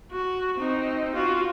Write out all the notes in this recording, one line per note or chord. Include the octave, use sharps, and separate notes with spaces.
F#4
C4 D#4
F4 F#4